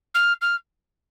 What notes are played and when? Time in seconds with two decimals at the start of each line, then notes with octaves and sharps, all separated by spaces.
0.14 F6
0.41 F6